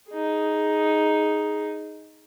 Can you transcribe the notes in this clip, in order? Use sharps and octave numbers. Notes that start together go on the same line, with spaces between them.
D#4 G#4